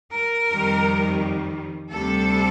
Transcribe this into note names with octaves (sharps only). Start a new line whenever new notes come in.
A#4
F2 D#3 G3
D2 C3 G3 A4